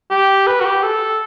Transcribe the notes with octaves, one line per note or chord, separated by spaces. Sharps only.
G4
B4
F#4
G4
A4